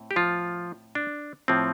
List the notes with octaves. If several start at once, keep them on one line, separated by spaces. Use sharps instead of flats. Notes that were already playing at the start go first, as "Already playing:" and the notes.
Already playing: A2 C4
G4
F3 F4
D4
A2 F3 C4